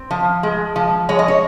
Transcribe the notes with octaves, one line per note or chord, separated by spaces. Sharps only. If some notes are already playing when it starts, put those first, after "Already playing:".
Already playing: C4
F3
G#3
F3
G#3 C#5
D#5
C#5